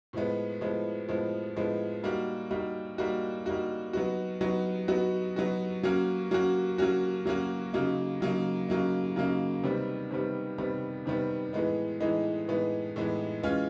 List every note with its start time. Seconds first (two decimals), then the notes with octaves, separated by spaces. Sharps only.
0.13 A2 F3 G#3 B3
0.61 A2 F3 G#3 B3
1.09 A2 F3 G#3 B3
1.56 A2 F3 G#3 B3
2.03 G3 A#3 D#4 F#4
2.50 G3 A#3 D#4 F#4
2.98 G3 A#3 D#4 F#4
3.46 G3 A#3 D#4 F#4
3.93 F#3 B3 D#4 F#4
4.41 F#3 B3 D#4 F#4
4.88 F#3 B3 D#4 F#4
5.36 F#3 B3 D#4 F#4
5.83 F#3 A#3 C#4 F#4
6.31 F#3 A#3 C#4 F#4
6.78 F#3 A#3 C#4 F#4
7.25 F#3 A#3 C#4 F#4
7.73 C#3 F#3 A#3 D#4
8.21 C#3 F#3 A#3 D#4
8.68 C#3 F#3 A#3 D#4
9.16 C#3 F#3 A#3 D#4
9.64 C3 D#3 G3 B3
10.11 C3 D#3 G3 B3
10.58 C3 D#3 G3 B3
11.06 C3 D#3 G3 B3
11.53 A2 E3 G#3 B3 D#4
12.01 A2 E3 G#3 B3 D#4
12.48 A2 E3 G#3 B3 D#4
12.96 A2 E3 G#3 B3 D#4
13.43 E3 G#3 C#4 F4